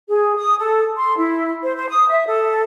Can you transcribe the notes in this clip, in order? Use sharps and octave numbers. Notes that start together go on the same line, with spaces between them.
G#4
D#6
A4
C6
E4
C5
C5
D#6
E5
A4